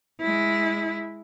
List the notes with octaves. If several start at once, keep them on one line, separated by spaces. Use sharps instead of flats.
G#3 E4